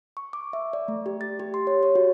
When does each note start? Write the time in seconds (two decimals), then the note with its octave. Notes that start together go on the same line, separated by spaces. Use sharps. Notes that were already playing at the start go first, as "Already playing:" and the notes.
0.17 C#6
0.33 D6
0.53 E5
0.73 D5
0.88 A3
1.06 G4
1.21 A6
1.40 G4
1.54 C6
1.67 C#5
1.83 C#5
1.95 F#4